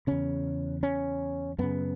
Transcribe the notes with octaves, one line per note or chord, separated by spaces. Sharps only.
E2 C#3 C#4
C#4
F#2 C#3 B3